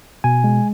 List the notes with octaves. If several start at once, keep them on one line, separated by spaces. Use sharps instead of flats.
B2 G#5
G#3